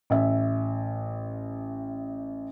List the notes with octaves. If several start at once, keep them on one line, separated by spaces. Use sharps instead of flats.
A1 E5